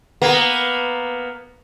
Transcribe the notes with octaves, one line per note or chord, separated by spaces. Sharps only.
A#3 B3